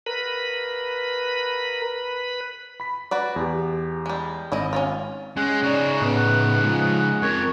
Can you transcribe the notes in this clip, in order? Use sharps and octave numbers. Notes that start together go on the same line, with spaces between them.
A#4 B4 B5
B5 B6
F#4 B4 D5
E2 G4
G3 G#3
G#1 G3 E4 D#5
C#4 E4 F4
G#3 C#4 F#5
C#3 D#4 F#4 D5
A2 B3 F#5
F3 G#3
F2 A#4 C#5